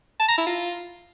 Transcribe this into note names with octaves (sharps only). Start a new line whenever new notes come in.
A5
A#5
E4
F4